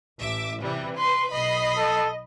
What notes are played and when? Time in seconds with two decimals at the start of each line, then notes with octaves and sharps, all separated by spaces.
0.20 A1 E5 D6
0.62 C3 E3 G3
0.98 B4 C6
1.32 B1 D#5 B5 C7
1.77 A4